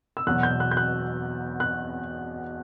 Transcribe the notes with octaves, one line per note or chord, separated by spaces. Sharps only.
E6
E2 B2 F#3 F#6
G6
F#6
G6
F#6
F#6